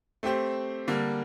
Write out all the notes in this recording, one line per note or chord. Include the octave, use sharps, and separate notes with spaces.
A3 C4 G4 C5
D3 G3 A#3